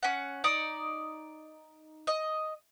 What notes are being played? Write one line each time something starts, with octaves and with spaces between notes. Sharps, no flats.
C#4 F#5
D#4 D5 D#6
D#5